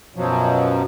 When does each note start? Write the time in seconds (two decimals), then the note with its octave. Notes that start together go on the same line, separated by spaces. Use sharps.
0.16 F#2 B2 F3 F#3